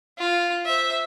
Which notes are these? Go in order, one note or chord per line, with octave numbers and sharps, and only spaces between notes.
F4
C5 E5